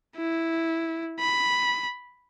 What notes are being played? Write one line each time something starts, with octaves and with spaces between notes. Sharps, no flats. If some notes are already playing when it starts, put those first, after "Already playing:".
E4
B5